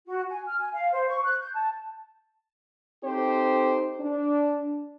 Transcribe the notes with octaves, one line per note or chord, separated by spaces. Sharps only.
F#4
G#5
F6
G#5
F5
C5
C#6
F#6
G6
A5
C4 D#4 G4 A4 C5
D4